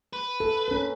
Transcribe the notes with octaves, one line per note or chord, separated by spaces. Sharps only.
B4
A4
C#4 A#4